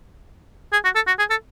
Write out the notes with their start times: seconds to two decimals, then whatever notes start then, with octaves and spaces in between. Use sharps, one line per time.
0.73 G#4
0.84 F#4
0.95 A4
1.07 F#4
1.19 G#4
1.30 A4